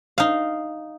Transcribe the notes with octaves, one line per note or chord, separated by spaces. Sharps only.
D#4 F5